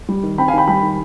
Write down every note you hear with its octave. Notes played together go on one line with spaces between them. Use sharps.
G3
D#3
C4 G5 B5
F5 G#5
D#3 G5 B5
G3 G5 B5
D#3